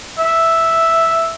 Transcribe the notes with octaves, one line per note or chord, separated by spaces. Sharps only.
E5